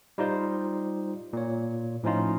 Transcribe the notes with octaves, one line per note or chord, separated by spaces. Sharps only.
G3 D#4 F4 C5
A#2 C#5
A2 F3 C#4 D#4 F4